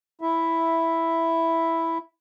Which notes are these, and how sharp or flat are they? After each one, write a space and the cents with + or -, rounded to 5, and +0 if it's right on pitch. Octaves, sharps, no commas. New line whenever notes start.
E4 +0 E5 +0